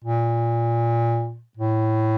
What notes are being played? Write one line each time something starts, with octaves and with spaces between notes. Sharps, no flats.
A#2
A2